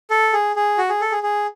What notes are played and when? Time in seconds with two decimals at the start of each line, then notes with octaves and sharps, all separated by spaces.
0.11 A4
0.33 G#4
0.56 G#4
0.78 F#4
0.90 G#4
1.01 A4
1.12 G#4
1.23 G#4